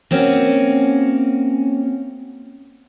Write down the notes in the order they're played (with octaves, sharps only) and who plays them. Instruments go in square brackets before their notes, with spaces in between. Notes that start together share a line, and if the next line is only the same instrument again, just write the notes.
[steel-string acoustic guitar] A#3 C4 C#4 F#4